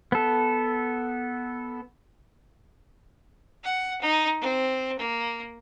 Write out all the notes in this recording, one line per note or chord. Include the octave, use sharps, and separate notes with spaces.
B3 A4
F#5
D#4
C4
A#3